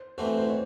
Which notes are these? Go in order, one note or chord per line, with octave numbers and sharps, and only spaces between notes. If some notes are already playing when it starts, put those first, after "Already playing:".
Already playing: C5
E3 A3 C4 F#4 C5
C5
C#5